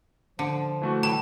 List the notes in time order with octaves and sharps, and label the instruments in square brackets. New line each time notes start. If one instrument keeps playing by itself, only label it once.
[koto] D3 [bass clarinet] F3
[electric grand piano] E3 A3 F#4
[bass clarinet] A2 [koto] G3 [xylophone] A5